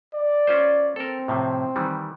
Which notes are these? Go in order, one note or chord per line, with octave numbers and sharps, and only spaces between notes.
D5
C#4 F4 C5
C4 A4 A#4
A2 C3 F3
D#3 E3 G3